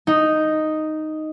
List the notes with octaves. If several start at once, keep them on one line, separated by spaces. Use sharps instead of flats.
D#4